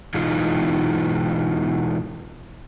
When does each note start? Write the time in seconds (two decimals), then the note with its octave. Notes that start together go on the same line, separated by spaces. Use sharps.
0.14 B2 E3 G#3 D#4 F4